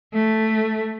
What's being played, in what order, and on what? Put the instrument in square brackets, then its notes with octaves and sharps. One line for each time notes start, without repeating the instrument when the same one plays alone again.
[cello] A3